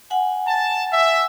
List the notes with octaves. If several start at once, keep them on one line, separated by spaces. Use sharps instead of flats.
F#5 G#5
A5
E5